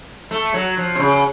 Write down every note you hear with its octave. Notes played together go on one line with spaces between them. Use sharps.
A3
F#3
F3
C3
C#3